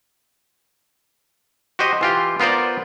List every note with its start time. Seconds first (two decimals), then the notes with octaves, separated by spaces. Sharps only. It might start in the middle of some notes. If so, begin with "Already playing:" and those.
1.79 F#4 G4 C5 D#5
2.01 E3 F4 G4
2.40 B3 F4 A#4 C5 D5